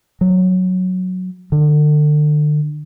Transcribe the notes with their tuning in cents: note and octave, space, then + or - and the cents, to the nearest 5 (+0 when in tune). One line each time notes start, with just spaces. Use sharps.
F#3 -5
D3 +35